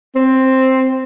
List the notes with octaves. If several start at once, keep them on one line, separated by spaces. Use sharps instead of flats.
C4